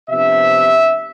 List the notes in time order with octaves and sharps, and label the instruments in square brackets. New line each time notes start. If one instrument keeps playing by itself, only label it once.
[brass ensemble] C3 F3 B3 D4 E5